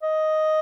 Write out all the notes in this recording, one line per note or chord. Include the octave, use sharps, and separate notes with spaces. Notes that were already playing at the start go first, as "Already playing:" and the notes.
D#5